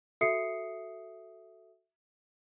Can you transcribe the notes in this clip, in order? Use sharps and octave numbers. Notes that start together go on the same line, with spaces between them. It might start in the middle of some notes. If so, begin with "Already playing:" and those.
F#4 A4 E5 D#6 C7 C#7